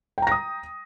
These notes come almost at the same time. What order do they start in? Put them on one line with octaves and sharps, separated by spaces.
G5 A#5 A#6 D#6